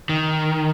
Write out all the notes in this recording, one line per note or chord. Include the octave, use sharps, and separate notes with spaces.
D#3